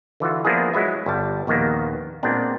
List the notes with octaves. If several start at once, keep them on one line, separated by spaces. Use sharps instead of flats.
D3 E3 F4 F#4
F3 A#3 B3 D4 E4 G#4
F#3 G#3 E4 E5
G1 G3 A5
A#1 D#2 D#3 A#3 B3
A#2 G#3 B3 C4 D4